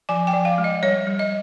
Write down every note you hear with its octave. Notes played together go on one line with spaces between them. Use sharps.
F3 G#5
G5
F3
F5
G#3
D#5
G3 C#5
G3
D#5